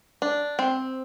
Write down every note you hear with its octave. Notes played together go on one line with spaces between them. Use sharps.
D4
C4